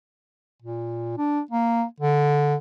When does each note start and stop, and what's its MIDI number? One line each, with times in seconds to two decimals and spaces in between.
0.62 1.15 46
1.18 1.40 62
1.51 1.84 58
2.00 2.55 50